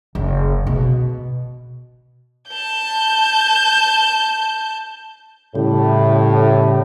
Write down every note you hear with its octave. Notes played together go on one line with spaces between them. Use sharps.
F#1
B2
A5 G6
A2 C#3 G3